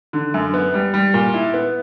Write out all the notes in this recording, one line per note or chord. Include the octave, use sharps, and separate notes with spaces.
D3
F#2
B3
G3
G3
A#2
E4
B3